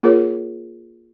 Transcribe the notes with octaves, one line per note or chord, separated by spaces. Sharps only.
A#3 F4 G#4 A#4 C#5